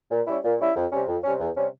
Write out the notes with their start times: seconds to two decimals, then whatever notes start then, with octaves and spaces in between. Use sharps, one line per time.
0.11 A#2
0.27 G3 C#4 E4
0.44 A#2
0.60 G3 C#4 E4
0.76 F2
0.92 C3 G3 C#4
1.08 F2
1.24 C3 G3 C#4
1.40 E2
1.56 C3 G3 C#4